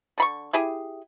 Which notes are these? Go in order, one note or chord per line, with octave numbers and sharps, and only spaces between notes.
D3 B5 C#6
E4 G4 G#4